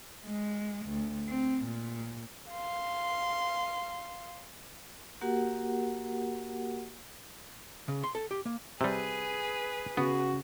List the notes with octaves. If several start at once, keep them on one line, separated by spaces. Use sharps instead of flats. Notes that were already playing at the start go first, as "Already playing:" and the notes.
G#3
D2
C4
A#2
F5 C6
A#3 F#4 G4 A#4 F#5
C#3
C6
A4
G4
A#3
C3 G3 G#4 B4
C#3 B3 F#4